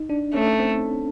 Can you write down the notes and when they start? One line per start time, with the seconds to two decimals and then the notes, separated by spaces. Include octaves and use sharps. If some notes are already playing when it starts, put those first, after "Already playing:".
Already playing: D#4
0.09 D4
0.34 A3 C#4
0.59 C4